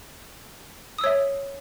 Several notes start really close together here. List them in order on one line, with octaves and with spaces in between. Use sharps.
D#6 E6 C#5 E5